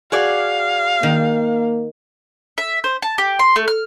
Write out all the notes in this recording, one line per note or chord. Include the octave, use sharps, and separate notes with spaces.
F#4 G#4 D5 F5
D#3 A#3
E5
C5
A5
G4
C6
A3
F6